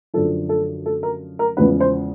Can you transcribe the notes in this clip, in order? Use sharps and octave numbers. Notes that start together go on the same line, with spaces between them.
F#2 D3 F3 A4
A4
A4
A#4
A#4
E2 C#3 F3 G#3 B3 B4
C5